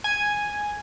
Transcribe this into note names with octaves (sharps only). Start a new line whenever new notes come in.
G#5